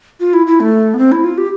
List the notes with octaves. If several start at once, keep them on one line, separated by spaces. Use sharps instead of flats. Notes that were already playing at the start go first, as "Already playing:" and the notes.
F4
E4
E4
A3
B3
C4
E4
F4
G4